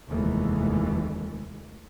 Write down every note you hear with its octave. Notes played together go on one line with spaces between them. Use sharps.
F1 D#2 E3 G#3 A3